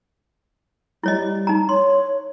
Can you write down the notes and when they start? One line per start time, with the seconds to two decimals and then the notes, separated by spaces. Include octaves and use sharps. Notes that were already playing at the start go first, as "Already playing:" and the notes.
1.04 G3 E4 C#5 D#5
1.47 D#4 A#5
1.69 C#5 C6